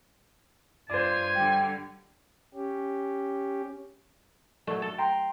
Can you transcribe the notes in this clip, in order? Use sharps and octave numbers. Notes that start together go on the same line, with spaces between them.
G2 F4 C5 D5 G#5
D3 G3 G5
C#4 G4
F#3 A3
A4
G5 A#5 C6